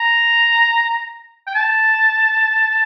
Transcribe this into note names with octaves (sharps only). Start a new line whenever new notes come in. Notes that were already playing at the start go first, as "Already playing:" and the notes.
Already playing: A#5
G5
A5